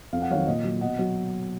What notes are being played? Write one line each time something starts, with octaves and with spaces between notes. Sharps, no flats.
F2 F5
F#5
D#3 F#3 C#5 F5
A#2 D#5
F#3
B2 D#5 F#5
F#3